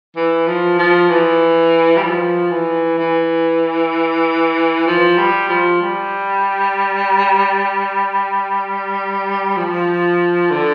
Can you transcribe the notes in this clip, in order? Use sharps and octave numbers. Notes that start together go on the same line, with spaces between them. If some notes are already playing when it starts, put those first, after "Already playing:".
E3
F3
F3
E3
G3
F3
E3
E3
F3
G3
F3
G3
F3
D3